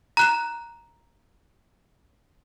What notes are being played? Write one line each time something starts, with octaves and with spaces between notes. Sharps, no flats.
A#5 F#6 E7